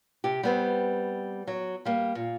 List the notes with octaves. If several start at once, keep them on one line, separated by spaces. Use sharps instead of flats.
C3 G4
G3 B3 C4
F#3
G3 A#3
A#2